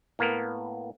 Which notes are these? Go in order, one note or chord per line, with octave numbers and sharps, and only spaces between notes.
A2 A#3 B3 A#4